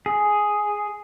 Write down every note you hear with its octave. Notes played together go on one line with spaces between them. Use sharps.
G#4